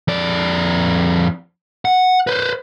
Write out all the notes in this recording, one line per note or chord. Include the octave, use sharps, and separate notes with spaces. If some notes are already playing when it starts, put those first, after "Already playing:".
F2 D5
F#5
B4 C5